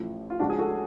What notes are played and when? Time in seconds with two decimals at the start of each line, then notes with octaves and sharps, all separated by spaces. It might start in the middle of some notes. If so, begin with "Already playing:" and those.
Already playing: A1 A2 F3
0.30 F4
0.39 C#2 C#3 F3 D4 F#4
0.50 G#4
0.58 F#4 A4